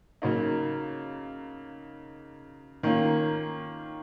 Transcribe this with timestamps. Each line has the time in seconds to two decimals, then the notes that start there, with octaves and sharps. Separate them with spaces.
0.22 C#3 F#3 A#3 D#4
2.83 D#3 A#3 C#4 F4